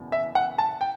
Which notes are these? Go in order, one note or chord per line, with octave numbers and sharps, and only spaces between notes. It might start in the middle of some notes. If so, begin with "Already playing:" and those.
Already playing: F#1 E2 B2
E5
F#5
A5
G5